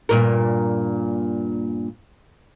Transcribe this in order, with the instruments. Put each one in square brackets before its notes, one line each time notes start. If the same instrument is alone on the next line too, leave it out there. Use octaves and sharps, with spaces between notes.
[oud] G2 A#2 A#4